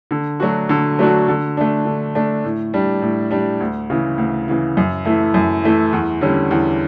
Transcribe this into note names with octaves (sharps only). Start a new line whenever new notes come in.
D3
F#3 A3 D4 F#4
D3
F#3 A3 D4 F#4
D3
A3 D4
D3
A3 D4
A2
G3 D4
A2
G3 D4
D2
C#3 E3
D2
C#3 E3
F#2
E3 A3 E4
F#2
E3 A3 E4
E2
D3 G3 C#4
E2